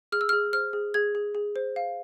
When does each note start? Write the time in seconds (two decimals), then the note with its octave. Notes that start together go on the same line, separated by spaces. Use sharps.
0.12 G#4 F6
0.21 E6
0.29 G#4 F6
0.53 C5 F6
0.73 G#4
0.94 G#4 G#6
1.15 G#4
1.35 G#4
1.56 C5
1.76 F5